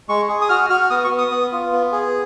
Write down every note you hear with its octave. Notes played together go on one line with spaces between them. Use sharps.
G#3 C#6
G#4
D#6
F#4 F6
F#4 F6
B3 D#6
C#6
B3
D#6
B3
F4
B3
G#4